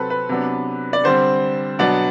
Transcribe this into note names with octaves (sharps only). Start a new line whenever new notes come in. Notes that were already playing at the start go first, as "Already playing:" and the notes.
Already playing: C3 F#3 C4 A4 B4
B4
C3 F#3 B3 D4
D5
D3 G3 C4 C5
B2 F#3 B3 D4 D5